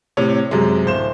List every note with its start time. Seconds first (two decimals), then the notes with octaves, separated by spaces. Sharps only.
0.17 A2 C3 C#5
0.51 F#2 C3 G#3
0.86 D1 C5 E7